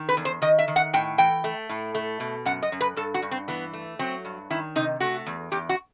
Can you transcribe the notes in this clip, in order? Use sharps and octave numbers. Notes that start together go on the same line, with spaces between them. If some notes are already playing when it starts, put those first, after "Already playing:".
Already playing: D#3
B4
E2
C5
D#3 D#5
E5
D#3
F#5
A2 G5
E3 G5
A3
A2
A3
B2
F#2 F#5
D#5
F#2
B4
G2 A4
F#4
G2
C4
E3 B3
A3
F#3 C4
G2
D#3 E4
C3 D#4
A3 F#4
E2
E2 G4
F#4